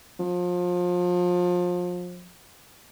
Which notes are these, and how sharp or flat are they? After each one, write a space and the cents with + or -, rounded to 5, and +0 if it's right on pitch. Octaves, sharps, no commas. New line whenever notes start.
F3 +30